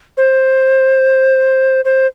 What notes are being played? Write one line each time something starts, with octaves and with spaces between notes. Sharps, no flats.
C5
C5